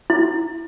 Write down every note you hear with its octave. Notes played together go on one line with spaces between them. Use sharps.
E4